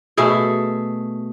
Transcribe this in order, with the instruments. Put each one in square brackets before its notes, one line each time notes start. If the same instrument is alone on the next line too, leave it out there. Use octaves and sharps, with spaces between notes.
[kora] B2 A3 G#4